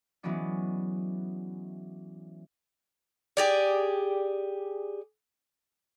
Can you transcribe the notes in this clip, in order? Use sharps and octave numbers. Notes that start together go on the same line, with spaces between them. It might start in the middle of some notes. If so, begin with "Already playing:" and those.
E3 F#3 G#3 B3 C#4 D5
G4 G#4 D5